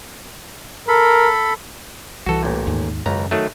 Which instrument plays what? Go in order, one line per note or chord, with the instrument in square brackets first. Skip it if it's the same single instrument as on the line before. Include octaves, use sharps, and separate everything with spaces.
[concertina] A4 B5 [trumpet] A#4
[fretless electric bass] C2 E3 [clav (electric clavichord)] F#4 A4
[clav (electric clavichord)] A1 A#2
[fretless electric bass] D#2 G#2
[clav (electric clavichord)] G#1 C#2 A#5 [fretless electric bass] F#2
[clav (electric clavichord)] D#3 F#3 A3